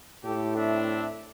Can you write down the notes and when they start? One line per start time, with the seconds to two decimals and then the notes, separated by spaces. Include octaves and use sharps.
0.25 A2 G4 A4
0.57 C4 D4 E5